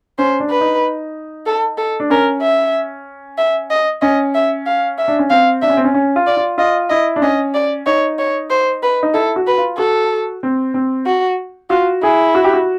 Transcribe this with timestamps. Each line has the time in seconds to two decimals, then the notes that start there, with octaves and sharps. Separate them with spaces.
0.18 C#4 C5
0.40 D4
0.50 B4
0.61 D#4
1.46 A4
1.77 A4
2.00 D4
2.10 C#4 A#4
2.42 E5
3.38 E5
3.71 D#5
4.02 C#4 D#5
4.35 E5
4.66 F5
4.98 E5
5.08 D4
5.19 C#4
5.30 C4 F5
5.62 D4 E5
5.70 C#4
5.77 C4
5.84 C#4
5.94 C#4
6.16 F4
6.27 D5
6.37 F4
6.58 F4 D#5
6.90 E4 D#5
7.16 D4
7.22 C#4 D#5
7.54 D5
7.86 D#4 C#5
8.19 C#5
8.50 C5
8.83 B4
9.03 D#4
9.14 E4 A4
9.36 F#4
9.47 B4
9.58 F4
9.78 F#4 A4
10.43 C4
10.74 C4
11.06 F#4
11.70 F4 F#4
12.03 E4 G#4
12.35 F#4
12.44 G4
12.53 F#4